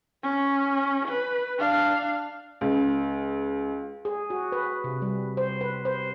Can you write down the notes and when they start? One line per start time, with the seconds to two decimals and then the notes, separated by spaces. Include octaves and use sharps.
0.23 C#4
1.08 B4
1.58 D4 F5
2.61 C#2
4.05 G#4
4.30 F#4
4.52 B4
4.84 C3
5.02 G3
5.37 C5
5.61 B4
5.85 C5